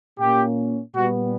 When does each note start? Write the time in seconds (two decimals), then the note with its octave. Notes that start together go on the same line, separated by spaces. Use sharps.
0.19 A#2 A#3 C#4 G4
0.95 A#2 G3 B3 F#4